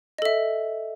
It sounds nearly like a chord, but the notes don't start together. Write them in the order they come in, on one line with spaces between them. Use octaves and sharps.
D#5 A4 E5